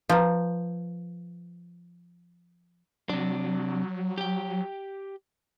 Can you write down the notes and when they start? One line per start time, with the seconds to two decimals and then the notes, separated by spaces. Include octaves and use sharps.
0.09 F3 B4 A#5
3.09 C3 F#3 D4
4.18 G4 G5